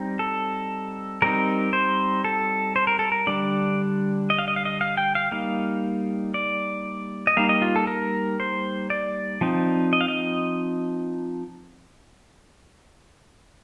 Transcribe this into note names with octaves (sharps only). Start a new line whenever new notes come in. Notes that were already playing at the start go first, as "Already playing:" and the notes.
Already playing: G3 C4 D#4
A4
G3 C4 D#4 A#4
C5
A4
C5
A#4
A4
A#4
D3 G3 D4 D5
D#5
F5
D#5
F5
D#5
F5
G5
F5
G3 A#3 D#4 F5
D5
D#5
G3 A#3 D#4 F5
D#5
F4
A4
A#4
C5
D5
F3 C4 D#4
D#5
F5
D#5